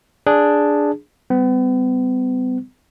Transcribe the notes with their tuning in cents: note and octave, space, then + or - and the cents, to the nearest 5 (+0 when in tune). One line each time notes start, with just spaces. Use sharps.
D4 +0 G#4 +0
G3 +0 B3 +40